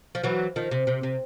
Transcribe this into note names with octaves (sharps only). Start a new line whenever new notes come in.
F3
E3 F#3
D#3 F3
C3
C3
C3